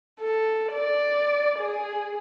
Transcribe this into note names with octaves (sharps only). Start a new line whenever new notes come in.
A4
D5
G#4